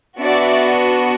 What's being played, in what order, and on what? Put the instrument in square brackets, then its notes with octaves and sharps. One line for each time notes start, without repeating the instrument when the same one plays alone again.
[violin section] B3 D4 F#4 D5 E5